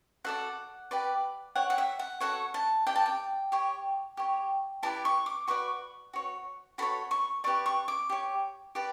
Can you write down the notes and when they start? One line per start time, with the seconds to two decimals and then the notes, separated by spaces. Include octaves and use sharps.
0.24 F#4 A4 D5 F#5
0.91 G4 B4 D5
1.56 G4 C#5 F#5
1.70 F#5
1.78 E5
1.99 F#5
2.20 F#4 A4 C#5 F#5
2.54 A5
2.87 G4 D5 G5
2.96 A5
3.06 G5
3.52 G4 C#5
4.17 G4 C#5
4.83 E4 G4 B4 D5 A5
5.05 C#6
5.26 D6
5.47 F#4 B4 D5 C#6
6.13 F#4 C#5
6.78 F#4 A4 C#5 B5
7.11 C#6
7.44 G4 B4 D5 C#6
7.66 C#6
7.88 D6
8.10 G4 C#5
8.75 G4 B4 D5